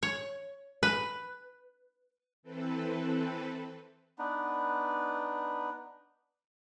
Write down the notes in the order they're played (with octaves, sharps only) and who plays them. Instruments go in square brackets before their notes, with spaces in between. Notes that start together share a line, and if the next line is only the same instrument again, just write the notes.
[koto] C#5
B4
[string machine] E3 C4 A4 B4
[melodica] B3 D4 D#4 B4